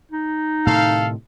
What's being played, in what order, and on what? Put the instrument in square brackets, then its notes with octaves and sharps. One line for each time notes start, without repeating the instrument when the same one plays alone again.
[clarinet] D#4
[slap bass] A2 C3 D#3 [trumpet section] A4 F5